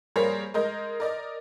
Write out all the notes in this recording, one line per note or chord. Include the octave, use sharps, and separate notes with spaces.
G3 A#3 G#4 A#4 C5 C#5
G#3 A#4 D#5 G6
A#4 D5 D#5